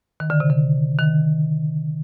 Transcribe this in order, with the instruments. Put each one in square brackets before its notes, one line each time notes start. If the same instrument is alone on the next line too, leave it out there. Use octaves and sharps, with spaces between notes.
[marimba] D#3
D3
C3
D3
D#3